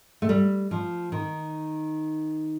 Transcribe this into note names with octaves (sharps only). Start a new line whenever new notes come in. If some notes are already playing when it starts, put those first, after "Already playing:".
A3
G3
F3
D#3